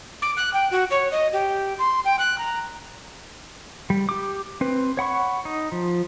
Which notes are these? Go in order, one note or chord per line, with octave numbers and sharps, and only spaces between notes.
D6
F#6
G5
F#4
C#5
D#5
G4
C6
G5
F#6
A#5
G3
G4 D6
C4 B4
C#5 F#5 B5 C#6
D#4
F3